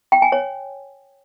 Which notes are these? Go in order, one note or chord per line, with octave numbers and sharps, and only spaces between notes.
G5
G#5
C#5